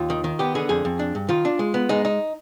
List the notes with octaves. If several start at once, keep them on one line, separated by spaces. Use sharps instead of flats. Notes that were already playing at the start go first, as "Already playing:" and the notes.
Already playing: D#2 F4
D#3
D#3
B3 G4
D3 G#4
F2 G#4
F2
D4
G2
D#3 F4
D4
G#3
B3
G#3 D#4
D#4